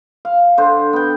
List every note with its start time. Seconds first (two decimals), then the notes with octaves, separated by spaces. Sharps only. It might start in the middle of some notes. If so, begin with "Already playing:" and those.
0.25 F5
0.58 D3 C5
0.93 B3 G5